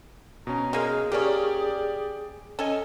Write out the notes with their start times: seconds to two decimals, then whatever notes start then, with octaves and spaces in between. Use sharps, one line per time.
0.47 B2 C#4 A#5
0.73 G#3 A#3 G#4 F5
1.12 A#3 C#4 G4 D5 G5
2.59 C#4 A4 D#5 G#5